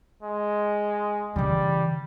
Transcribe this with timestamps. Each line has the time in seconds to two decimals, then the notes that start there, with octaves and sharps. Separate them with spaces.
0.23 G#3
1.36 C#3 E3 G3